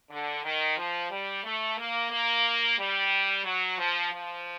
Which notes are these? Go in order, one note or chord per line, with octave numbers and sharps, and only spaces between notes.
D3
D#3
F3
G3
A3
A#3
A#3
G3
F#3
F3
F3